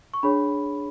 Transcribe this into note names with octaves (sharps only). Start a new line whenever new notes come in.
C#6
D4 G#4 C#5 B5